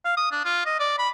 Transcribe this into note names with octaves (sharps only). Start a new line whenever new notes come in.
F5
D#6
D4
F4
D#5
D5
B5